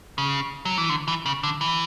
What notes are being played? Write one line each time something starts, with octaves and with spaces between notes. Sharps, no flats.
C#3
F#3
E3
D3
E3
C#3
D3
E3